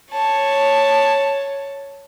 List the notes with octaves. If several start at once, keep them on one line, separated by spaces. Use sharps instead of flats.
C#5 A5